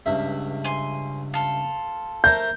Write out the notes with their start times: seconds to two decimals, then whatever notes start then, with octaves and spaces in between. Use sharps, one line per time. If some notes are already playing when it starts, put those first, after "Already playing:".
0.06 C#2 G2 E5
0.64 G#5 C6
1.34 F4 A4
2.24 A3 A#4 C5 G6